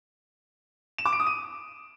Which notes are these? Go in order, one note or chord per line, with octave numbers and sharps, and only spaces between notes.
E7
D6
D7
D#6
D#7